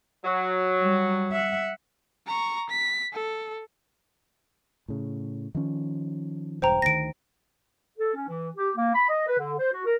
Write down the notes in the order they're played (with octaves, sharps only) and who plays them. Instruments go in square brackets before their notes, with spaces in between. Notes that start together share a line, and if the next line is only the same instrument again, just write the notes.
[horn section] F#3
[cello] G3
E5 F#5
[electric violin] A#5 C#6
B6
A4
[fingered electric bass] A2 C#3
D#3 F3 C#4
[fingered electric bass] E1 G2 [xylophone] C5 G5 A#5
[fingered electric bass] D2 D#3 [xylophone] A#6 D7
[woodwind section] A4
C#4
E3
G4
A#3
B5
D#5
B4
D3
C5
F#4
A#4